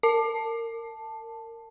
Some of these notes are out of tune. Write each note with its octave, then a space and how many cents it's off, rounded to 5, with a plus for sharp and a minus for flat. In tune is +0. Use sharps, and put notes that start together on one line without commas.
A#4 -25 A5 +0